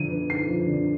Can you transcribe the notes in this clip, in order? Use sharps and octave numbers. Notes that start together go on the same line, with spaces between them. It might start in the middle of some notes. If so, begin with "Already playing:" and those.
Already playing: D3 F3 D#7
B3
D#4 C7
F3
D3